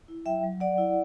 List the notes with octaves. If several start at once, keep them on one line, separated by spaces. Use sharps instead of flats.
E4
F#3 E5 G5
F#3
F#3 D5 F#5
E4